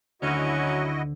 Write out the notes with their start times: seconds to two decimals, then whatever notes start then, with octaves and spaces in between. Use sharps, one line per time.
0.22 D2 D3 D#3 F#3 C#4 E4 F#4 D#5